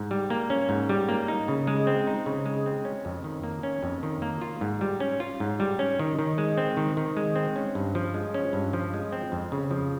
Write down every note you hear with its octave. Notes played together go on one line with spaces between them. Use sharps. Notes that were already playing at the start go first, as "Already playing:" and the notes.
Already playing: G#2
G3
A#3
C#4
G#2
G3
A#3
D#4
C#3
G#3
C4
D#4
C#3
G#3
C4
C#4
F2
D#3
A#3
C#4
F2
D#3
A#3
F4
G#2
G3
C#4
F4
G#2
G3
C#4
D#3
D#3
G#3
C4
D#3
D#3
G#3
C4
C#4
G2
F3
G#3
C#4
G2
F3
G#3
C4
F2
C#3
F3